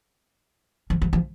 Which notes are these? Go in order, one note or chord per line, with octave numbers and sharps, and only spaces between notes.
F3
F3
F3